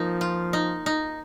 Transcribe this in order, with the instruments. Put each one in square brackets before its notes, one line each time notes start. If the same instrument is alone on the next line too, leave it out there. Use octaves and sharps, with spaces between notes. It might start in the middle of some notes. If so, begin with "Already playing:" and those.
Already playing: [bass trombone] F3 [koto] A#3 D#4
[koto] F4
D#4
D#4